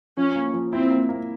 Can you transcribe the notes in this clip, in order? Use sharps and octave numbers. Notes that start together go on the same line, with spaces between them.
F3 C#4
A#3
F3
C4 E4
A#3
A#3